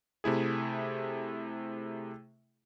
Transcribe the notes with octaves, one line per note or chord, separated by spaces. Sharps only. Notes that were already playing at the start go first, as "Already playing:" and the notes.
C3 A3 E4 G#4